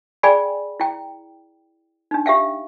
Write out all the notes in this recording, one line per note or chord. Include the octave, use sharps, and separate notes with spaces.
G#4 D5 G5 G#5 B5
E4 G5
D4 D#4
G4 E5 F5 G5